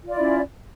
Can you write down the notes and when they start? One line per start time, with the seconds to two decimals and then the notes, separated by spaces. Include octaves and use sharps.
0.04 F4
0.08 D5
0.13 E4
0.18 C#4